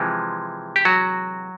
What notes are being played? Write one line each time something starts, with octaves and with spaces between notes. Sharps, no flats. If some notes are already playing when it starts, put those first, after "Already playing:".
Already playing: C3 E3 F3 G#3
G4
F#3 F#4